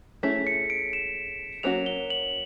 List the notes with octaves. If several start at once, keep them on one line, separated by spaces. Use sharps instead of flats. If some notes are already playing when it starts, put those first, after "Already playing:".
A3 C#4 E4 G#4 B6
C#7
D7
E7
F#3 A#3 C#4 F#4 F7
G7
F#7